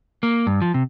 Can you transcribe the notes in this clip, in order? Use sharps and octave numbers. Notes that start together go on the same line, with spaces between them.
A#3
G2
F3
C3